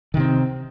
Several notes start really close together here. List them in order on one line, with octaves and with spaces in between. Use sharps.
D#3 C3 C4